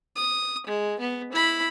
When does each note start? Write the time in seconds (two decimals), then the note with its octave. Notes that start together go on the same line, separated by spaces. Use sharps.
0.16 D#6
0.67 G#3
1.00 B3
1.32 E4 B5